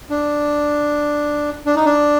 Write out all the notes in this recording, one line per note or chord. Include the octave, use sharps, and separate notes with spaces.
D4
D4
D#4
D4